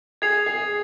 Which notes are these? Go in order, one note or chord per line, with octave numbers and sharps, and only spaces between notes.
G#4 G#6 C7 F7
G#4